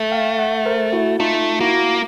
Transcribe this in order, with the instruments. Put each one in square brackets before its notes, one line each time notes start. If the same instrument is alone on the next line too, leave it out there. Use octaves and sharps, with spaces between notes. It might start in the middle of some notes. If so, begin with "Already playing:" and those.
Already playing: [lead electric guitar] A3
[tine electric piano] F5 G5
E5 F#5
A#4 C5
E4 F#4
[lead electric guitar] A3 [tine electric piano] D#4 F4
[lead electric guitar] A#3 [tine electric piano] E4 F#4